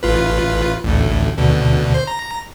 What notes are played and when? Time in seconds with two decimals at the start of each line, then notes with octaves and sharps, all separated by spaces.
0.03 A1 F4 B4
0.85 A1 D2 A2
1.38 D2 B2 D3
1.94 C5
2.07 A#5